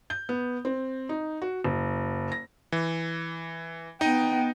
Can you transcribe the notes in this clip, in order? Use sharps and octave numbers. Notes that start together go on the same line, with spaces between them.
G6
B3
C4
D#4
F#4
F#1
A#6
E3
B3 D#4 D#5 G5